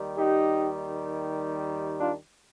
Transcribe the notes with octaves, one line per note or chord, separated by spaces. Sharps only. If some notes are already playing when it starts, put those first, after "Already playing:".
Already playing: D#2 D#3 G3
D#4 G4
D4 F4